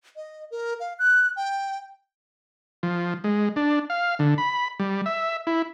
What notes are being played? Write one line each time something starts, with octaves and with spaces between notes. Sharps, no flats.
D#5
A#4
F5
F#6
G5
F3
G#3
D4
F5
D3
B5
G3
E5
E4